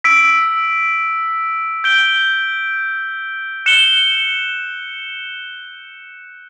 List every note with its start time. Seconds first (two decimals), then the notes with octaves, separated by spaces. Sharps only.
0.04 E6 B6 D7
1.84 G6 D7 G7
3.66 F#6 C#7 E7 G7